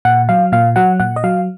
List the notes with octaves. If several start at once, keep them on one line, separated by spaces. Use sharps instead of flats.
A#2 F#5
F#3 F5
A#2 F5
F#3 F#5
A#2 F#5
D#5
F#3 F5